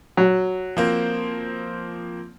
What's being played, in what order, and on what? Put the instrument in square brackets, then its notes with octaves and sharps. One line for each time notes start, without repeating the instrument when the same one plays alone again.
[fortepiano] F#3
[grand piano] F3 A#3 C4